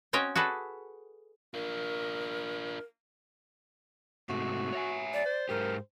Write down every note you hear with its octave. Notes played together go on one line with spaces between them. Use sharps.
C4 C#4 F#4 C#5 D#5 G5
F#4 G#4 A4 B4 D5
D4 F4 A#4
G#2 C3 A3 F#4
C#5 E5 G#5
D5
C5
G#2 G4 A#4